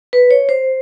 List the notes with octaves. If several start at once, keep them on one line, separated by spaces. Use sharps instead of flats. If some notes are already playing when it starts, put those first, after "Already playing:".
B4
C#5
C5